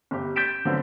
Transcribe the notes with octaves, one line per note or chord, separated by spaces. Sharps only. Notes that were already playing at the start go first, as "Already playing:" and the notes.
G1 G4
G6 A6 B6 D7 E7
D3 F3 F#3 B3 C4